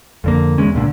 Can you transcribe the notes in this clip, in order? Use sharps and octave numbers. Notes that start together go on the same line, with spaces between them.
F2 D3 A#3
E1 E2 G#3 C#4
C#2 A#2 D3